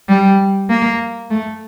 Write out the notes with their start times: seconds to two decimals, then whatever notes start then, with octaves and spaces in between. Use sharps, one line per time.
0.09 G3
0.69 A#3
1.31 A3